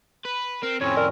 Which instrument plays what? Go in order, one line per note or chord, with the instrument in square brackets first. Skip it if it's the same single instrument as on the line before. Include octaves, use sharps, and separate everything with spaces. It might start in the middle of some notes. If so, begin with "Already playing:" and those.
[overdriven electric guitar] B4
[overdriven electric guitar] C4 [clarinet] A#4
[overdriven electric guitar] F2 A2 [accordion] C4 C#4 [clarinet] C#5
[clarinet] A#4 [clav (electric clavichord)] D5